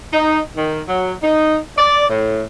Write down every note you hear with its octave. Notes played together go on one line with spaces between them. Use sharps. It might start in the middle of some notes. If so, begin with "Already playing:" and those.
D#4
D#3
F#3
D#4
D5
A2